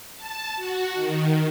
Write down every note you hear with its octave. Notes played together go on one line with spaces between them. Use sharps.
A5
F#4
D#3